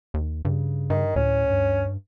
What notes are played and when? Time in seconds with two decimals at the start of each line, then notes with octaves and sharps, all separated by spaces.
0.14 D#2
0.45 G2 C#3
0.90 G2 D#3
1.16 D2 A2 C#4
1.50 G2